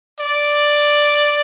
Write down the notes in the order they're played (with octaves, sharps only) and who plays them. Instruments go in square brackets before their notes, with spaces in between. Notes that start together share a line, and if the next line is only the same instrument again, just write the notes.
[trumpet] D5